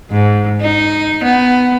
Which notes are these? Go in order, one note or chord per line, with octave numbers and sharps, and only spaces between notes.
G#2
D#4
B3